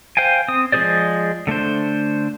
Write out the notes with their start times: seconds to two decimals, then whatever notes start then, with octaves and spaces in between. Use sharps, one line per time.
0.17 C5 F5 G5 G#5
0.48 C4 D#6
0.72 F3 G#3 G#4 C5 D5
1.47 D3 A3 D4 C5